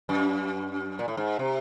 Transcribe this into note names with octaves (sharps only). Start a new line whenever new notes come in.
F#2
A#2
A2
G#2
C3